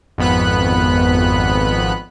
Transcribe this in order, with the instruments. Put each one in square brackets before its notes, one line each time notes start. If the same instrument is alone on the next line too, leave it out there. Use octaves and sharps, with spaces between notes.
[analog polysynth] G#1 F2 B3 B5 F#6